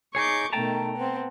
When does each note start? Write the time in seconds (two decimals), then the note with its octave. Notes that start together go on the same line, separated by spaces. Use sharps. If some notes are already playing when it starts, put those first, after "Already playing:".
0.15 D#4 G#4 C#5 C#6 D6 G6
0.53 B2 D#3 A3 G5 A5 A#5
0.96 B3 C4